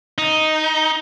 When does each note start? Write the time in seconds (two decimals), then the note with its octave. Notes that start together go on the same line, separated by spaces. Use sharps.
0.18 D#4